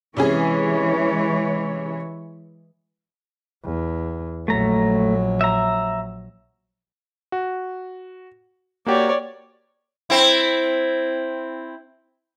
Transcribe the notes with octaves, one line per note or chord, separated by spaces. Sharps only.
C3 E3 G#3 C#4 G#4 C#5
E2
A#1 F#3 A3 A#5
E5 A#5
F#4
A#3 F#4 G4 C#5 D5
C4 E4